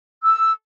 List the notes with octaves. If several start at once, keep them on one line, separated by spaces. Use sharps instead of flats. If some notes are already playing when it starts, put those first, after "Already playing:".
E6